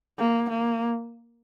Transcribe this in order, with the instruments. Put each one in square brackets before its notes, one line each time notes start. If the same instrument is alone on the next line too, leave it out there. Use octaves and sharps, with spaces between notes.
[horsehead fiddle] A#3
A#3